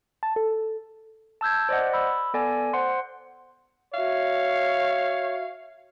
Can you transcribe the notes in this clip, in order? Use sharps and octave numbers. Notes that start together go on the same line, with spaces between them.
A5
A4
A5 E6 G6 G#6
C5 D5 D#5 F#5
B5 E6
B3 A4 D5 G#5
C5 F#5 C6
F#4 C#5 E5 F5